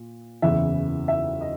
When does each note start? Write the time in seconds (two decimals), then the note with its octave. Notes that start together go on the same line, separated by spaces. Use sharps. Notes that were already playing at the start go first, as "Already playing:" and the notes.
Already playing: A#2
0.42 F#1 E2 C#3 E3 E5
1.08 E5
1.41 D#5